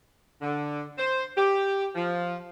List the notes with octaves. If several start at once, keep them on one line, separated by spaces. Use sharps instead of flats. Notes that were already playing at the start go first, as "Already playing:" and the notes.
D3
C5
G4
F3